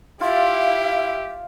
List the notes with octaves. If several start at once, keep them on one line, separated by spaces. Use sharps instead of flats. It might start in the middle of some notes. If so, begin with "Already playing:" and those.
E4 F4 G4 E5 F5